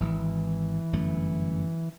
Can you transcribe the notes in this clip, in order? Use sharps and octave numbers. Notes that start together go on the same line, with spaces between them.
D#1 G#1 E3
G1 F#2 A3